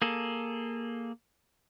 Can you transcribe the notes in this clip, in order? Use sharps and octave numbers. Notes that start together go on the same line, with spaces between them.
A#3 G#4 A4